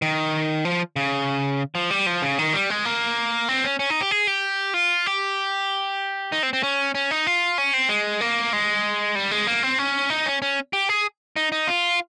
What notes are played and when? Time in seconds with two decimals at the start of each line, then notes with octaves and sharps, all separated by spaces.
0.02 D#3
0.65 F3
0.96 C#3
1.75 F3
1.91 G3
2.06 F3
2.22 C#3
2.38 D#3
2.53 G3
2.70 G#3
2.85 A#3
3.49 C4
3.64 C#4
3.79 C#4
3.90 D#4
4.01 G4
4.11 G#4
4.27 G4
4.74 F4
5.06 G4
6.32 D#4
6.43 C4
6.53 C4
6.63 C#4
6.95 C#4
7.11 D#4
7.27 F4
7.58 C#4
7.74 C4
7.89 G#3
8.21 A#3
8.53 G#3
9.15 G3
9.31 G#3
9.47 A#3
9.63 C4
9.79 C#4
10.10 D#4
10.26 C#4
10.42 C#4
10.73 G4
10.89 G#4
11.36 D#4
11.52 D#4
11.67 F4